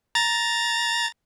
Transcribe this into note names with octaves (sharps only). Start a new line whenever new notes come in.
A#5 A6